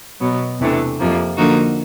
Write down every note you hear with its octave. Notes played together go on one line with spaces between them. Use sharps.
B2 F#3 B3
E2 C3 E3 A3 D4
F2 C3 F3 A#3
D3 F3 A#3 D#4 F#4